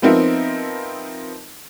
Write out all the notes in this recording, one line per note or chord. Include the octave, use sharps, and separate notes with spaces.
F3 B3 C4 D#4 A#4 E5